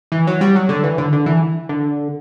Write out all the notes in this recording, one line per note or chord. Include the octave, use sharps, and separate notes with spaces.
E3
F#3
G3
F#3
D3
E3
D3
D3
E3
D3